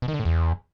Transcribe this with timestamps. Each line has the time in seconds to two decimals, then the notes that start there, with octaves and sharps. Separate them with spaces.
0.02 B2
0.08 D#3
0.14 D3
0.20 A2
0.25 E2